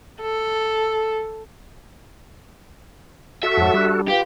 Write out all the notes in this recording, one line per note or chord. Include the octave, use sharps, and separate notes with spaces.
A4
F#4 A4 E5
F2 G#2 C#5 F#5 A5
G3 D4 F#6
F4 G4 B4 F5